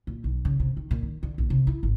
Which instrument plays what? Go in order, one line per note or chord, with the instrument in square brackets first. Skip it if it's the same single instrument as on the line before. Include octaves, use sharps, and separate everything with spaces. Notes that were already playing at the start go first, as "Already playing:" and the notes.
[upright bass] A#2
B1
C#3
C3
D#3
A#2
D#3
D3
A#1
C3
E4
G#1